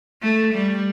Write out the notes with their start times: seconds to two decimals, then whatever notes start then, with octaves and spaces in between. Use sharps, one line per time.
0.22 A3
0.54 G3